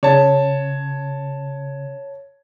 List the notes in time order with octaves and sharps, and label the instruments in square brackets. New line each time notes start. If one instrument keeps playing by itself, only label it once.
[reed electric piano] C#3 [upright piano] C#5 A5